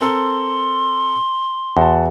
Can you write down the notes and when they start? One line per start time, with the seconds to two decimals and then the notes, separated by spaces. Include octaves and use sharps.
0.01 C4 A4 A#4 C6
1.77 E2 F#4 A5